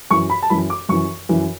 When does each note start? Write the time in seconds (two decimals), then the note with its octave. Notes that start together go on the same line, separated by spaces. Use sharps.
0.11 F#2 E3 C#6
0.30 B5
0.42 A5
0.50 F#2 E3 B5
0.70 D6
0.89 F#2 E3 C#6
1.29 F#2 E3